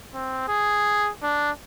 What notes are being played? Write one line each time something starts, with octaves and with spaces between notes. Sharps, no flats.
C4
G#4
D4